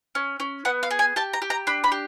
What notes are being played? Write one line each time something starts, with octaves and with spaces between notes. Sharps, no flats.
C#4
C#4
B3 F#5
F5
G#4
G#5
G4 A5
A#5
G4
A#5
D4 B5
B5
G4